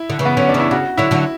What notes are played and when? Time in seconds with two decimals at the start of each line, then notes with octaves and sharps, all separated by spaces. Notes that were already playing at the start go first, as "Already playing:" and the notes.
Already playing: E4
0.10 D3
0.19 C#3 E3
0.25 B3
0.37 D3 F#3 C#4
0.49 D4
0.54 C#3 E3
0.60 E4
0.71 C#3 F#4
0.97 D3 F#3 E4
1.11 D3 F#3